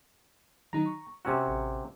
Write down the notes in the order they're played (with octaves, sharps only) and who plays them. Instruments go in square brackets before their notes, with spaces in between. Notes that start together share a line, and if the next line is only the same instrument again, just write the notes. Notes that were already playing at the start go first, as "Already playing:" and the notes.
[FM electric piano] D#3 F#3 D#4 [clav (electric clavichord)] A#5
[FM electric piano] C#6
[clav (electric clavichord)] C3 C#4 F#4 [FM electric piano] A#5 E6
[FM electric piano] A1